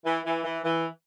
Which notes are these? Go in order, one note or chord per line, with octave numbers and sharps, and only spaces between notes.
E3
E3
E3
E3